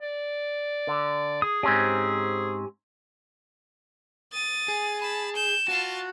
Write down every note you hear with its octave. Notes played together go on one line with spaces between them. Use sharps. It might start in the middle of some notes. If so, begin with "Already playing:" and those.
D5
D3
G#4 D#6
G#2 C4 C#4 G4 G#5
D#6 A6 D#7
G#4
A5 B5
G6 E7
F4 F#4 A5